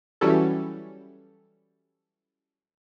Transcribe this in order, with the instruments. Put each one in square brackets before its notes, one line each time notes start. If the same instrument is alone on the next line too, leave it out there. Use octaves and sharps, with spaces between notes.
[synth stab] E3 F#3 G3 C#4 E4 A4